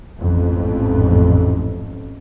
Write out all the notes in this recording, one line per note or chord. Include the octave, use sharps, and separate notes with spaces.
A1 F2 G#2 A3